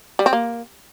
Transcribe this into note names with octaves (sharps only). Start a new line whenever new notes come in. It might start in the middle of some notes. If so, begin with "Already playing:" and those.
G3
C4
A#3